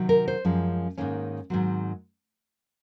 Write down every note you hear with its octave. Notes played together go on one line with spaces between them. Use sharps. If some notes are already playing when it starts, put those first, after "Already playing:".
Already playing: C3 D#3 F#3
A#4
C5
F#2 F3 G#3 C#4
G#2 D#3 A#3 C#4
G#2 D#3 F#3 C4